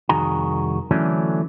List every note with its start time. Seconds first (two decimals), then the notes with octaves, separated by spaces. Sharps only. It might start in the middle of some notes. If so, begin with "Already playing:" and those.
0.09 C2 F2 D#3 F#4 G#4 A#5
0.91 D3 E3 F#3 A3 C#4 D4